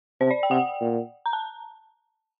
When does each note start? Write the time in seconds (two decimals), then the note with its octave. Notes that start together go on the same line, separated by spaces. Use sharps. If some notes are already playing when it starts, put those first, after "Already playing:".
0.21 C3 C5
0.31 D5
0.43 G5
0.50 C3 F#5
0.81 A#2
1.26 A#5
1.33 A5